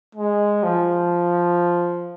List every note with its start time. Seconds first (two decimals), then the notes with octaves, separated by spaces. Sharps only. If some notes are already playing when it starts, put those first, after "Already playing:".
0.15 G#3
0.63 F3